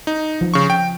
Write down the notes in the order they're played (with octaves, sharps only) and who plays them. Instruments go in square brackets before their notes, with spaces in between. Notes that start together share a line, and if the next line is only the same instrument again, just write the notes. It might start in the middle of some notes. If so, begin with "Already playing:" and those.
[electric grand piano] D#4
[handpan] F3
[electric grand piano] C#3 C#6
G5